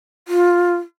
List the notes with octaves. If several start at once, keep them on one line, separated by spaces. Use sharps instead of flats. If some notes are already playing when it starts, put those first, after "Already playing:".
F4